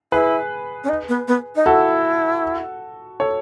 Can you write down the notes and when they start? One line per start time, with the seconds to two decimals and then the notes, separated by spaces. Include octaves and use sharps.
0.12 E4 G#4 B4
0.84 C#4
0.89 D#4
1.09 B3
1.28 B3
1.56 D#4
1.66 E4 F#4 A4
3.20 A4 C#5